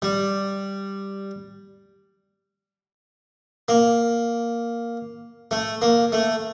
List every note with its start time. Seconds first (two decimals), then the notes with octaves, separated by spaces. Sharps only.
0.02 G3
3.68 A#3
5.51 A3
5.82 A#3
6.12 A3